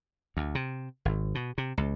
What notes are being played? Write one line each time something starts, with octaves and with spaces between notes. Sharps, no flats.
D2
C3
G#1
B2
C3
C#2